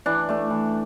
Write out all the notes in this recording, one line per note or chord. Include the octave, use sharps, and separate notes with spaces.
E3 D4
A3 D4
E3